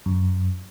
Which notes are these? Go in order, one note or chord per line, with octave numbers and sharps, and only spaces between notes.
F#2